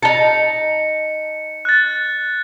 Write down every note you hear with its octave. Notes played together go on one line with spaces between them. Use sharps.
D#4 A5 C#7
F#6 A6